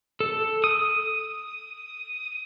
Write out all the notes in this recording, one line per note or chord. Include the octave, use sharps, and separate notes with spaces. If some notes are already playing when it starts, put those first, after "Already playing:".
A4
D#6